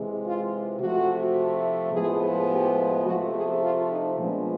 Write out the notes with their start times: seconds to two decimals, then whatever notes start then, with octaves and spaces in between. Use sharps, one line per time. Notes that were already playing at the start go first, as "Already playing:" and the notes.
Already playing: C3 E3 G#3
0.24 F4
0.80 C3 F3 A3 F#4
1.93 A2 F3 G#3 B3 G#4
2.50 G4
3.06 C3 F3 A3 F#4
3.35 G#4
3.63 F4
3.91 D#4
4.19 A#2 F3 G#3 B3 D4